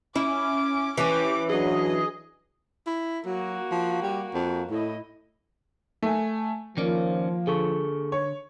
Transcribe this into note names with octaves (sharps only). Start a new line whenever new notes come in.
C#4 E4 D6
E3 C#4 G4 D6
F#3 D4 G#4 D#5
E4
F#3 A#3 F#4
F3
G3
F2
A2 E4 D#5
A3 G#5
D#3 F3 A#3 C#4 D5
D3 G#4 A4 C#6
C#5